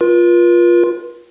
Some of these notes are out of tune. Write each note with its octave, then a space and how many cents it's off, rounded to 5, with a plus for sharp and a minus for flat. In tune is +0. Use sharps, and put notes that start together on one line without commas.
F4 +0 B4 -45